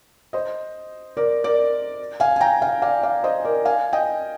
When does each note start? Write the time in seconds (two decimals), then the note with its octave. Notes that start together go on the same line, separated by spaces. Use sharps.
0.33 C5 D#5
1.17 A#4 D5
1.44 A#4 D5
2.20 F5 G#5
2.36 G#5
2.41 G5 A#5
2.62 F5 G#5
2.82 D5 F5
3.03 D5 F5
3.24 C5 D#5
3.44 A#4 D5
3.65 F5 G#5
3.93 D#5 G5